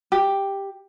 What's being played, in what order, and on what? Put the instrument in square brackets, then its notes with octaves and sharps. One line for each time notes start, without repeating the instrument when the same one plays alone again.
[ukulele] G4